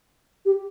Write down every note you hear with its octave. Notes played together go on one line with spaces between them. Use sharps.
G4